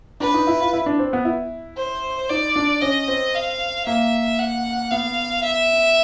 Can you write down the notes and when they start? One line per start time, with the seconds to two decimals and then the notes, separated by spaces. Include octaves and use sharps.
0.20 D4 B4
0.34 D#4
0.47 E4
0.61 F4
0.73 E4
0.86 D4
0.99 C4
1.13 B3
1.25 E4
1.77 C5
2.30 D#4 D5
2.56 D4
2.82 C#4 D#5
3.08 C4
3.35 F5
3.86 A#3 E5
4.39 F#5
4.91 B3 F5
5.44 E5